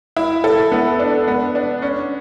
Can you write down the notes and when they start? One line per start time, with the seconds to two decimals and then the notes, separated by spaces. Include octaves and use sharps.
0.17 E4
0.44 A4
0.72 B3
0.99 D4
1.27 B3
1.55 D4
1.82 C#4